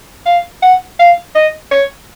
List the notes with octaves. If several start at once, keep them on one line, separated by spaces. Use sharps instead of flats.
F5
F#5
F5
D#5
C#5